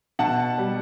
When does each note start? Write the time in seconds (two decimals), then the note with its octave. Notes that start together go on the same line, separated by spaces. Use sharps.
0.19 B2 F#5 A5
0.58 G3